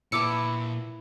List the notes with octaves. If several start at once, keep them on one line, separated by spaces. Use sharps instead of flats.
A#2 E4 B4 A5 D6 E6 C#7